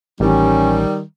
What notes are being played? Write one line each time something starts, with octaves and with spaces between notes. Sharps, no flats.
A1 D#3 G3 C#4